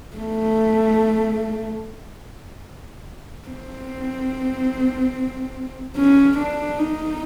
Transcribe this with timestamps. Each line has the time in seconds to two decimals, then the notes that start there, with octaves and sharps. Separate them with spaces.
0.16 A3
3.48 C4
5.96 C#4
6.38 D4
6.78 D#4